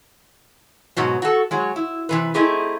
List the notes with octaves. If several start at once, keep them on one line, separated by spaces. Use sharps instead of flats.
G#2 B2 F#3
F#4 A4
F#3 G#3
E4
C3 E3 B4
A3 C4 D#4 E4 G4 G#4